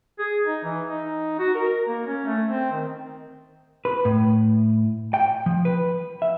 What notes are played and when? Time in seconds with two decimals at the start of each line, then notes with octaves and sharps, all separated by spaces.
0.19 G#4
0.45 D#4
0.64 E3
0.88 D#4
1.39 F#4
1.55 A#4
1.87 A#3
2.07 C#4
2.26 A3
2.49 C4
2.72 D#3
3.85 B4
4.05 A2
5.14 G5
5.46 F3
5.65 B4
6.22 E5